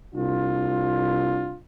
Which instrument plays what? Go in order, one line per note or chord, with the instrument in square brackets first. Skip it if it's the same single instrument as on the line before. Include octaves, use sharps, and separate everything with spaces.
[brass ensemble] C2 D4 F4